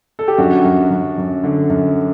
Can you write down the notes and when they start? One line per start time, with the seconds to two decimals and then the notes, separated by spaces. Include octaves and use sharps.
0.19 A4
0.28 G4
0.38 F#2 D4 F#4
0.64 F#2
0.91 F#2
1.18 F#2
1.44 D3
1.70 F#2